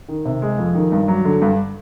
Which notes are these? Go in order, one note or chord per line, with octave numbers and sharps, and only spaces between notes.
D#3
C3
G#3
F2
D#3
G2
F#3
D3
G2